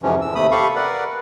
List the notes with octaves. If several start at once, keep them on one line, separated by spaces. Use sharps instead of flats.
F2 G#2 C3 E3 F3 C#4
E2 E6
D#2 C3 A3 B5 D#6
G4 A4 F5 B5 C#6
A#4 B4 D5 F#5